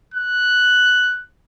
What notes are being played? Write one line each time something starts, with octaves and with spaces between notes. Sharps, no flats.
F#6